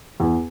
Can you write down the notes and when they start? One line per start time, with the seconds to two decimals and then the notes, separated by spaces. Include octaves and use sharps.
0.20 E2